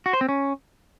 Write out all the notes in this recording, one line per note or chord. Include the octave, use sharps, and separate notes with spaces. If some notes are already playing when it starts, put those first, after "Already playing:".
F#4
C5
C4
C#4